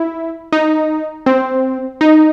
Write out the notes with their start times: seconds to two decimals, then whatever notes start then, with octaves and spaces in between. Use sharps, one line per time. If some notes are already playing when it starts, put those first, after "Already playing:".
Already playing: E4
0.52 D#4
1.26 C4
2.01 D#4